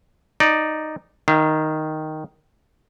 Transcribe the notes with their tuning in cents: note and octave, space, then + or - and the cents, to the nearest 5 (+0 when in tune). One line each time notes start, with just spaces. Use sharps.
D#4 -5 D5 +5
D#3 +0 F5 -40